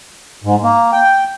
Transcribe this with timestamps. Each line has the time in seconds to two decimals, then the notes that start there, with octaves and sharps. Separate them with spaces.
0.44 G#2
0.63 A#3
0.93 G5